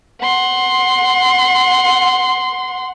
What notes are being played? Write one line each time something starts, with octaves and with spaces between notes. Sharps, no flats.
F#5 C6